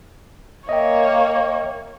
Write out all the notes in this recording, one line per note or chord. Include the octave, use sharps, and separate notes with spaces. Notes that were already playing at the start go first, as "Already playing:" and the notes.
A#3 C#5 D#5 E5 G5